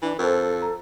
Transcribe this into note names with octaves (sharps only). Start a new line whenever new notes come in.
E3 D4
F2 A4 A#4 C5
A#5